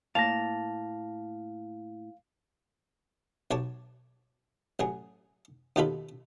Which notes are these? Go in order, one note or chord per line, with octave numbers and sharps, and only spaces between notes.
A2 A#3 F5 A5 A#6 F7
B1 C#5 A5 D6
A1 F#3 G#4
D#2 B2 D#3 F4 A4 B5